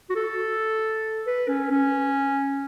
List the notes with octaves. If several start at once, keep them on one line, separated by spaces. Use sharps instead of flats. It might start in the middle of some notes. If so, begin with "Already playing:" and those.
F#4
A4
B4
C#4
C#4